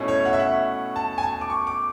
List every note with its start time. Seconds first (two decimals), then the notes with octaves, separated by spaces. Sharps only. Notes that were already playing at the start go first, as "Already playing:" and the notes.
Already playing: B2 A3 C#4 E4
0.08 C#5
0.25 F#5
0.33 E5
0.39 F#5
0.96 A5
1.18 G#5
1.23 A5
1.41 D6
1.50 C#6
1.67 D6